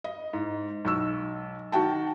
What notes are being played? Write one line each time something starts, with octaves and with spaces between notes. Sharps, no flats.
D#5
G#2
B1 C#6 E6
D#3 F#4 G5 A5